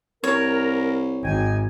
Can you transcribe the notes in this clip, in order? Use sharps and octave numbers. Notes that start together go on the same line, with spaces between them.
C2 A#4 C#5
G#1 D#5 G5 G#5